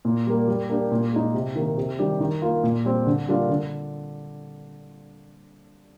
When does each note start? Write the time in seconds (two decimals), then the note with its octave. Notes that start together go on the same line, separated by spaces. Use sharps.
0.05 A#2
0.27 G3 A#3
0.48 G3
0.69 A#3 D4 G4
0.91 A#2
1.13 G#3 D#4
1.34 C3
1.55 D#3 A#3
1.77 C3
1.99 D#3 G3 D4 G4
2.20 D#3
2.42 A#3 F4
2.63 A#2
2.85 G3 C4
3.07 D3
3.28 G3 A#3 D4 F4
3.49 D3